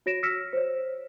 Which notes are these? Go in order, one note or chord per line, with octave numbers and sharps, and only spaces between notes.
F#4 C#5 A#6 D7 E7
E6 F6 A#6 B6 C#7 E7
C5 C#5